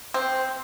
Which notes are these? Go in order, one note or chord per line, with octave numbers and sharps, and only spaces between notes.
C4